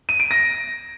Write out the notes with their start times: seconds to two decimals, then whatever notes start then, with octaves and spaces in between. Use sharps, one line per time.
0.09 D#7
0.20 D7
0.31 A#6